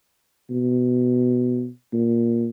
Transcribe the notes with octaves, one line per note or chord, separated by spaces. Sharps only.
B2
A#2